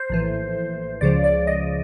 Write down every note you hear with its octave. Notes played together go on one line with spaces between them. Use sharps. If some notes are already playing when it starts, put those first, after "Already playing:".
Already playing: C5
A#1 A2 E3
C#2 C#3 F3 D5
D5
D#5